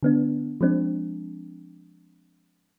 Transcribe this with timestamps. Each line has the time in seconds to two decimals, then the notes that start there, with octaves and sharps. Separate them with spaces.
0.03 D3 B3 D4
0.61 F3 G#3 C4 D4